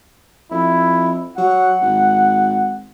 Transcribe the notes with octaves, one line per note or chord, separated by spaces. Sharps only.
F2 E4
F#3 F#5
G#1